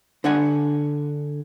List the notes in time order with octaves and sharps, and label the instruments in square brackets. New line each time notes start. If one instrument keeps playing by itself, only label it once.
[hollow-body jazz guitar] D3 D4 F#5 G#5